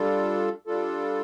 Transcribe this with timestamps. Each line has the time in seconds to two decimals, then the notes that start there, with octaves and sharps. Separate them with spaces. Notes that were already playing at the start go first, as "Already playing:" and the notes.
Already playing: G3 D4 F4 A4
0.67 G3 D4 F4 A4